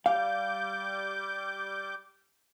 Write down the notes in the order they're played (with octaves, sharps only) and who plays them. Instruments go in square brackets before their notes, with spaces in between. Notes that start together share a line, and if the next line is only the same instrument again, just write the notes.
[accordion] G3 D6 G6 [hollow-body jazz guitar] F5